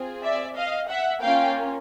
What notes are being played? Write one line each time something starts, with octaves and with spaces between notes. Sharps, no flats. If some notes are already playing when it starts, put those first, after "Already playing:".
Already playing: C4 F4 G#4
D5 E5
D#5 F5
E5 F#5
A#3 C#4 F4 F5 G5